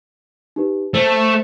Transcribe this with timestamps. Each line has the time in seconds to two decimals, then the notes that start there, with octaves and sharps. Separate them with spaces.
0.56 D#4 G4 B4
0.94 A3 C5